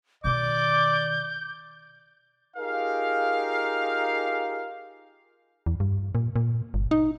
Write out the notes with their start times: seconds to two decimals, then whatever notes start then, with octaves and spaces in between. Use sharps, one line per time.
0.24 B2 D#3 D5 D6 G6
2.57 D#4 F4 G4 G#4 A#4 F5
5.66 E2
5.80 G2
6.15 A#2
6.36 A#2
6.74 G1
6.91 D#4